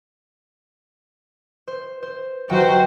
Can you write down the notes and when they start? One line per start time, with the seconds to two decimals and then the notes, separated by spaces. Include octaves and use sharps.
1.67 C5
2.03 C5
2.49 G1 F#3 F#4 C5 G5